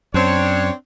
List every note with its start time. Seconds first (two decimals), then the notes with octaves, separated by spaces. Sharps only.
0.14 F#2 C4 D4 C#5